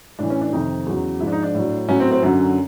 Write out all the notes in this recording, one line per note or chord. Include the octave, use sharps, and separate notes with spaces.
A2 E3 D4
C#4
D4
F2 C3 D#3 D#4
E2 C#3 F#3
G#2 F3 E4
D4
D#4
D4
A2 F#3
A2 F#3 C#4
C4
C4
F#2 D3 F#3